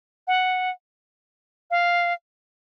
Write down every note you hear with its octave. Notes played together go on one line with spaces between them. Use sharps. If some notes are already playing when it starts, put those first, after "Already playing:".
F#5
F5